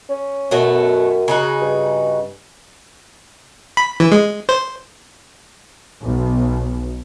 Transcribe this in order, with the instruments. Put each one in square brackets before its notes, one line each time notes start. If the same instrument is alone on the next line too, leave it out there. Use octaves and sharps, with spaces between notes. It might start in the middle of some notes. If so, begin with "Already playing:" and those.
[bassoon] C#4
[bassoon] F#2 [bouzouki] B2 F#3 A3
[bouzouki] C#3 D#4 F#4
[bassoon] G2
[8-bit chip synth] B5
E3
G#3
C5
[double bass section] B1